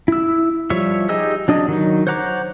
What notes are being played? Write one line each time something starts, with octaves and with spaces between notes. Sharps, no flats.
E4 E6
F3 G3 C#5 E5
D#4 G4 G#4 D#5 E6
F#3 D4 D#5
D#3 F#3 D#4
C5 C#5 F#5 A#5 D6